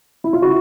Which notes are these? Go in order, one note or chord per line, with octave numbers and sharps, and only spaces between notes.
E4
F4
C#3 E4 F#4